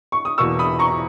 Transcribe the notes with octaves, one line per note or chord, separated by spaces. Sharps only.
C#6
D#6
E2 B2 A#3 C#6 E6
B5 D#6
A#5 C#6